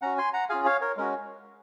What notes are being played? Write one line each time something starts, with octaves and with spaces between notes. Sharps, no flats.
C#4 F#4 F#5 A#5
G#5 C6
F#5 A#5
C#4 F4 G#4 F5 G#5
C#5 F5
A#4 C#5
G#3 C#4 F#4 A#4